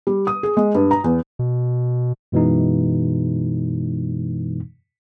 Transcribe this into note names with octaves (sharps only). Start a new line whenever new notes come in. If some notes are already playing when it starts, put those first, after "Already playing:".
G3
D#6
G#4
G#3
G2
A#5
E2
B2
F#2 B2 E3 G#3 D#4